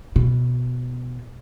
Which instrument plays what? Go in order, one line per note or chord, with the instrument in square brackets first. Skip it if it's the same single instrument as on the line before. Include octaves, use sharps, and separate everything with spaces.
[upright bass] B2